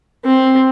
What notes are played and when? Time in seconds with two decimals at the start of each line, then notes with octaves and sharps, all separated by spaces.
0.25 C4